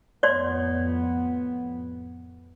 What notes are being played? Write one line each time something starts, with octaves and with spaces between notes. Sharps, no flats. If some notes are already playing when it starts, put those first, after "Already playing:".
F2 A2 B3 C#5 D5 C6